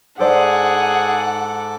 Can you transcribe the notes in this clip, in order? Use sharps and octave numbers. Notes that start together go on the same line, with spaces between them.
G#2 G#4 A4 B4 C5 D5 F#5 D6